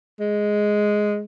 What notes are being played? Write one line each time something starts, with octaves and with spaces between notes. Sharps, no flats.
G#3